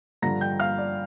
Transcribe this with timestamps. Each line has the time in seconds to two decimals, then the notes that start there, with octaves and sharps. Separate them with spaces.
0.22 G2 D3 F3 A#5 A#6
0.41 G5 G6
0.60 F5 F6
0.78 D5